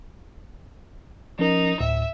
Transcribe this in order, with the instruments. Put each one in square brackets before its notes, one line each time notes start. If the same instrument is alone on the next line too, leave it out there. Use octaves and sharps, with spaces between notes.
[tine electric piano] F3 C#4 A#4 [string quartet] D#4
[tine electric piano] D2 A2 [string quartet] E5